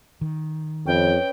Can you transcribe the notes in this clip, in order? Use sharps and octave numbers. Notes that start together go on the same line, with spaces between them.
D#3
F2 C#4 B4 D#5 G5